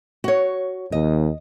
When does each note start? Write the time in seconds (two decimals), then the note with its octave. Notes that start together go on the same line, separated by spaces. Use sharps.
0.24 F#4 C#5
0.92 D#2 D#5